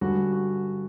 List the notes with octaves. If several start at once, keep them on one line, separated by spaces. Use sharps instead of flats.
G2 D3 G3 C#4 F#4
F#4